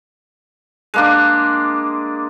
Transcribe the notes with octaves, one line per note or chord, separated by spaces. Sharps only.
G#3 A#3 D4